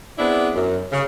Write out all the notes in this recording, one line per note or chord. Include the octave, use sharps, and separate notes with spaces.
B3 C4 D4 E4 G#4
F#2
C#3